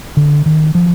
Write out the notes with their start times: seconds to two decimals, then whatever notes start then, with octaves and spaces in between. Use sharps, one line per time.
0.17 D3
0.46 D#3
0.75 F3